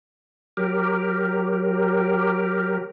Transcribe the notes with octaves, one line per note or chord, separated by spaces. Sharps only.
F#3 G4 A#4